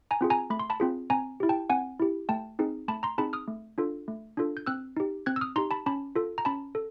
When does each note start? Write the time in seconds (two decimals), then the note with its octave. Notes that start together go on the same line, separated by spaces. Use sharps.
0.11 G#5 A#5
0.21 C4 F4 G#4
0.30 G#5 A#5
0.50 A3 B5
0.59 C6
0.70 A5 B5
0.80 C4 F4 G#4
1.10 C4 G#5 A#5
1.40 E4 G4
1.49 G5 A5
1.70 C4 F#5 G#5
2.00 E4 G4
2.29 A3 G5 A5
2.59 C4 D#4 G#4
2.88 A3 A5 B5
3.03 A#5 C6
3.18 C4 D#4 G#4 A5 B5
3.33 D#6 F6
3.48 A3
3.78 D4 F4 A4
4.08 A3
4.37 D4 F4 A4
4.57 G6
4.66 C4 E6 F#6
4.97 D#4 G4
5.26 C4 F#6 G#6
5.36 E6
5.41 D#6 F6
5.56 D#4 G4 A#5 C6
5.71 A5 B5
5.86 C#4 A5 B5
6.16 F4 A4
6.38 A#5
6.45 C#4 A5 B5
6.75 A4